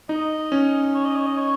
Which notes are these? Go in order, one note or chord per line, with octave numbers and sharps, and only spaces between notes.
D#4 D#5
C#4
C#5
D#5
C#5
D#5
C#5